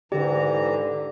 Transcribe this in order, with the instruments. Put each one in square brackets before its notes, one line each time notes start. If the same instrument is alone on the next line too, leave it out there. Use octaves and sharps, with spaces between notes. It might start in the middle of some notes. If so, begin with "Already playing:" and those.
[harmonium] G#2 E3 A#5 [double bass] D3 [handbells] G4 [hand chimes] A4 D5